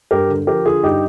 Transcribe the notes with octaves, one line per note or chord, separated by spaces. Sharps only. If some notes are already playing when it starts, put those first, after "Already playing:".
G2 G4 A#4
D3
F3 G4 A#4
D3 F4 G#4
G2 D#4 G4